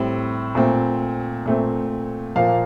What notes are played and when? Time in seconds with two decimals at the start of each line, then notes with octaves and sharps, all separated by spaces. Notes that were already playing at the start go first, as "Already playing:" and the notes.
Already playing: A2 G3 C4
0.55 A#2 A3 C4
1.46 A#2 A3 C4
2.36 A#2 F3 A#3 F5